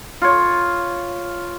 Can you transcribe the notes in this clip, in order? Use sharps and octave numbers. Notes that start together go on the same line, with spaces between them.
F4 C#5